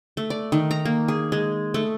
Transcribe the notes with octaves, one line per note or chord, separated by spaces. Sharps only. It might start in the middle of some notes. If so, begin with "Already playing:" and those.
A3
D5
D#3
A#5
A#3
G#4
G#3
A3